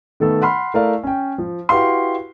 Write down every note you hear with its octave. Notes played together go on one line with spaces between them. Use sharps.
D#3 A3 B3 A4
F#5 B5 C6 F6
A3 E4 A#4 D5 F5
C#4 G5
F3
E4 F#4 G4 B4 F5 C6